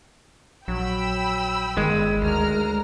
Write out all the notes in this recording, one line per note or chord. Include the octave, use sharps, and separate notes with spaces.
A#1 F#3 G5 B5 E6
G1 D#3 G#3
D2 A#4 A#5 F6